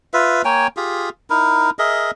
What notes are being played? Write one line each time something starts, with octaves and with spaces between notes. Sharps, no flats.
F4 B4 E5
A#3 C#5 G5 G#5
F4 G4 G#4
D#4 E4 A#4
G#4 A#4 D#5 E5